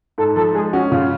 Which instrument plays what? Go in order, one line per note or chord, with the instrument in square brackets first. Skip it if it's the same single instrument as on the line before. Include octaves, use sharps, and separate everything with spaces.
[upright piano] G#2 [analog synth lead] A4
[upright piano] F3 [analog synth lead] A4
[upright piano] G#3 [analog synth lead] G#4
[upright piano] C#4 [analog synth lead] F#4
[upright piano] C#3 [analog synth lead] F4